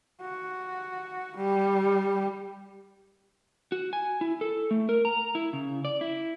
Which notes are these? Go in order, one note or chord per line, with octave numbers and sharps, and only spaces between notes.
F#4
G3
F#4
G#5
E4
A4
A3
A#4
A#5
E4
C#3
D5
E4